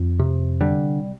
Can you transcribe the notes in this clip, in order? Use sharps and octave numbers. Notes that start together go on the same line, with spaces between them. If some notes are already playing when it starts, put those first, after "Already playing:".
Already playing: F2
C3
D3 G3